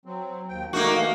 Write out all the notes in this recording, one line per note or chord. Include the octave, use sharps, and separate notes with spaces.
F#3 C4
D#2 G5
A3 A#3 D#4 F#4 A#4
E3 A3 F5